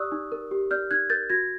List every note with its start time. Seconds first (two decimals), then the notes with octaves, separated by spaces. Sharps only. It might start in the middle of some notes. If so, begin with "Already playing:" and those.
Already playing: G4 D5 C#6 D#6 E6 F#6
0.12 D#4
0.32 A#4
0.51 G4
0.71 D5 F6 G6
0.91 D#4 F#6 G#6
1.10 A#4 G6 A6
1.30 F#4 G#6 A#6